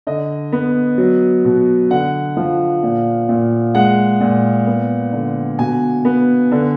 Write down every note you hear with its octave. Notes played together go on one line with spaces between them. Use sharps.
D3 D#5
B3
F#3
B2
D3 F#5
F3
A#2
A#2
G#3 F#5
A#2
B3
D3
B2 G#5
B3
D3